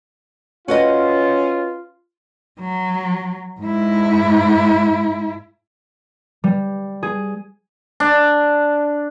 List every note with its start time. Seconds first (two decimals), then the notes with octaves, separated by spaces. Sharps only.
0.68 C#4 F4 F#4 B4 D#5
2.60 F#3
3.61 G#2 E4
6.44 G3
7.03 G#4
8.00 D4